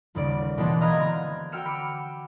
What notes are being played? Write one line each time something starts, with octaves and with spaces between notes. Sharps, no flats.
G1 D#2 C#3 A#3 D5
B2 E3 G#3 A#3 C4 D4
D#5 F5 A#5 B5 F#6 G#6
D3 C4
F#4 G5 E6 F6 C#7 E7
B5 D6 C#7